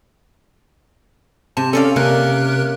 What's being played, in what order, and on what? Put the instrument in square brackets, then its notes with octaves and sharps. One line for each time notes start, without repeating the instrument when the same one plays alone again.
[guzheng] C3 [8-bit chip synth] A5
[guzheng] C#4 D5 F5 [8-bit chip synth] A4
[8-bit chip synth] C3 A#4 F#6 [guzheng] A#3